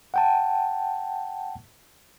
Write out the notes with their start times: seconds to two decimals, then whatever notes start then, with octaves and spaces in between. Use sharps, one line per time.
0.14 F#5 G5 A5